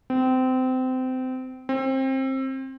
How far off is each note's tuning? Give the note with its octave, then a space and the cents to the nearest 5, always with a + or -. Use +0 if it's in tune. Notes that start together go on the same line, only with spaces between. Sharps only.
C4 -25
C4 +25